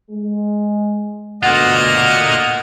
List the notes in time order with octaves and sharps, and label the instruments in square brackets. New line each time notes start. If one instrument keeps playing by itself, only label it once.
[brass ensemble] G#3
[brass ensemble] D2 B2 [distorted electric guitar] A#3 F4 [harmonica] D#5 [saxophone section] F#5